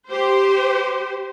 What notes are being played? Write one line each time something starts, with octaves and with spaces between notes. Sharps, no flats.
G4 C5